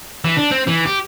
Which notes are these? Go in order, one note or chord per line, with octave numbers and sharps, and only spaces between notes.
E3
D4
C4
E3
G4